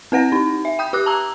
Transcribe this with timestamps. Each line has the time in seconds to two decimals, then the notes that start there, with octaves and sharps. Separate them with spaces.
0.12 C4 B4 F#5 A#6
0.32 D#4
0.65 E5
0.79 G5 D#6 G6
0.93 G4 D6 F#6
1.06 A5 A#5 E6